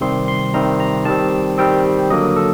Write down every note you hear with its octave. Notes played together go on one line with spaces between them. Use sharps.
C3 D#3 G3 C4 C6
C6
C3 D#3 G3 C4 A#5
A#5
D#3 G3 C4 A5
D#3 G3 C4 G5
D3 F#3 A#3 D#5
A4